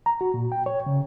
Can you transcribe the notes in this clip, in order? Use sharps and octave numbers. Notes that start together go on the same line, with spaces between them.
A#5
F#4
A#2
G5
C#5
C#3